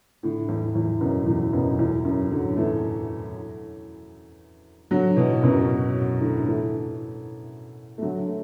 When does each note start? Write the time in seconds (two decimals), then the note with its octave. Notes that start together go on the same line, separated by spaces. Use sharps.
0.23 A2 D3
0.49 E2 A2
0.75 E2 A2
1.01 F#2 B2
1.27 E2 A2
1.53 F#2 B2
1.79 E2 A2
2.05 F#2
2.31 D3 F#3
2.57 E3 A3
4.91 D3 F#3
5.16 B2 E3
5.43 F#2 B2
6.20 A2 D3
6.46 E3 A3
7.98 A3
8.02 D3 F#3
8.28 A3